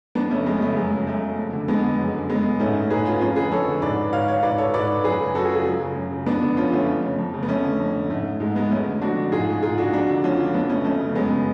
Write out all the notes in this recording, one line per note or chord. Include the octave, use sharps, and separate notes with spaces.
F2 B3 D4
C#3 A3 C#4
F2 G#3 B3
C#3 A3
F#2 G#3
C#3
F#2 A3
C#3
F2
D3
F2 G#3 B3
D3
F#2
D3
F#2 G#3 B3
D3
G#2 A3 C#4
G#2 G#4 B4
C#4 F4
F2 C#4 F4
D3 G#4 B4
F2 A4 C#5
D3
G#2 B4 D5
G#2 C#5 F5
C#5 F5
G#2 B4 D5
A4 C#5
G#2 B4 D5
F#2 G#4 B4
C#3
F#2 F#4 A4
F4 G#4
C#3
F4 G#4
F#2
C#3
F#2
C#3
F2 B3 D4
D3
F2 C#4 F4
D3 A3 C#4
F2
C#3
F2
C#3
B3
F2 A3 C#4
D3
F2
D3
G#2 A3
G#2 G#3
G#3 B3
F2 A3 C#4
D3
F2 D4 F#4
D3
G#2 F4 G#4
G#2 F4 G#4
D4 F#4
F2 D4 F#4
D3
F2 C#4 F4
D3
F2 B3 D4
C#3 A3 C#4
F2 A3 C#4
C#3
F#2 G#3 B3
C#3